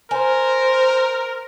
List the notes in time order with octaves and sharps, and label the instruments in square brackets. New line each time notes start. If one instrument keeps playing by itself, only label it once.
[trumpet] A#4 [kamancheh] C5 [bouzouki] G#5